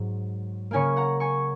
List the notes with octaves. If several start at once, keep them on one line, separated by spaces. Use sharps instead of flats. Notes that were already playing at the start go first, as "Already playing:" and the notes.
Already playing: G#2 F#3
C#3 A#3 C#4 G#5 C#6
F#5 A#5
G#5 C#6